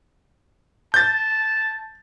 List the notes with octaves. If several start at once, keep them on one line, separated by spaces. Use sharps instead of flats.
A5 G6 A6